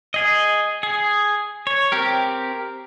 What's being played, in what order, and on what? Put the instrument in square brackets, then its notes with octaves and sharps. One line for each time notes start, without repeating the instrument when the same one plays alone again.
[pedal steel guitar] G#4 D#5
G#4
C#5
C4 G4 A#4